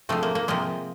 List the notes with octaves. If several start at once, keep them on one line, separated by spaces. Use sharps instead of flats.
C3 F3 G#3 A3
A#3
A#3
C3 F3 G#3 A#3